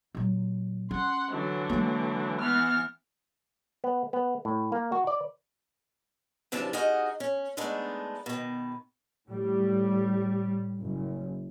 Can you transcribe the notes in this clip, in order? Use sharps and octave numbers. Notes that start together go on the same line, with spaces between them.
A#2 F#3
C#4 F#5 C6
D3 E3 F#3
G#3 A#3
E3 B3 F6
B3
B3
A2
A#3
F#4
D5
F#2 C3 E3 F3 D4 A5
D#4 F#4 G#4 A#4 D#5 F#5
C#4
G#3 A3 B3 D4 D#4
B2 D#3
A2 G3
F#1